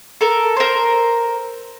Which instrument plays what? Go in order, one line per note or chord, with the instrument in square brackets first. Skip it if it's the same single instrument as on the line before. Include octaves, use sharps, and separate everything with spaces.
[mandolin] A4 A#4
A#4 C5